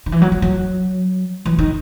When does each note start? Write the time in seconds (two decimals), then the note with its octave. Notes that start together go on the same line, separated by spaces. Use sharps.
0.06 D#3
0.12 E3
0.21 F#3
0.32 F#3
0.42 F#3
1.45 E3
1.59 D#3